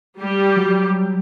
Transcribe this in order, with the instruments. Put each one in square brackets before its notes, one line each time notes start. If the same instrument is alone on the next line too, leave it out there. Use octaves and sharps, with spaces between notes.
[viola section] G3 G4
[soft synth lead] F#3